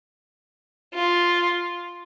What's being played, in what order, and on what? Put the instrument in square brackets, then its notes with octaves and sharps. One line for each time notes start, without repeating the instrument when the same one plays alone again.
[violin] F4